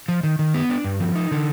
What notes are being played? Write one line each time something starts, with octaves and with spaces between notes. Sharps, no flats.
F3
D#3
D#3
B3
D4
G2
F3
D#4
D3